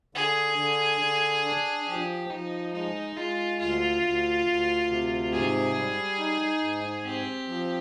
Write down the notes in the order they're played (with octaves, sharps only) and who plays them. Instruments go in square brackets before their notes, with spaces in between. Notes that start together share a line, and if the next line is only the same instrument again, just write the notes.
[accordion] D3 [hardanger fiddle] G#4
[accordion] D3
D3
D4
[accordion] F3 [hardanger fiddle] G4
[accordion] F3 [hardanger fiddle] D#4
[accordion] G#3 [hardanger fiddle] D#4
[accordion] G#3 [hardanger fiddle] F4
[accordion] D2 [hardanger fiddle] F4
[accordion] D2
D2
C3
[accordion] G#2 [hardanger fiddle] G#4
[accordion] G3
D#4
G#2
[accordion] C4 [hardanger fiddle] G4
[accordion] F3